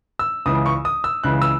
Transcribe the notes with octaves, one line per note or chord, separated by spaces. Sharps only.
E6
C#2 C#3 E3 D#6
C#6
D#6
E6
C#2 C#3 E3 F#6
E6